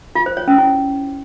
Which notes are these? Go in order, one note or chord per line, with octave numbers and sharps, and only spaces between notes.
F4
C5
C#5
C#4
E4